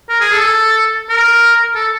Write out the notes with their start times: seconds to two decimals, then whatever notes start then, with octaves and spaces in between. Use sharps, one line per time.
0.09 A#4
0.21 G#4
0.32 A4
1.10 A#4
1.75 A4